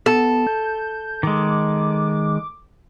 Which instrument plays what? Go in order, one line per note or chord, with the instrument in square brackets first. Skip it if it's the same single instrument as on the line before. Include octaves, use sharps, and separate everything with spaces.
[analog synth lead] B3 [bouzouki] A4
[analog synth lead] G6
[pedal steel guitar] D#3 G#3 [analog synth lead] D6